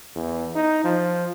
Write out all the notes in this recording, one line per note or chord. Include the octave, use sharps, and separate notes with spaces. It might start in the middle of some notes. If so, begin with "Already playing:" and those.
E2
D#4
F3